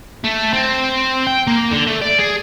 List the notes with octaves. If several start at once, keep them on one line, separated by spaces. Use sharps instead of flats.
A3
C4
G5
A#3
D3
A3
D5
G#4